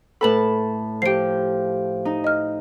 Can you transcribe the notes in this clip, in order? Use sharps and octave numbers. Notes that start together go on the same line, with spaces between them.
A2 A4 B4 A5 B5 F#7
F3 G4 C7 D7
D#4
D#5 F6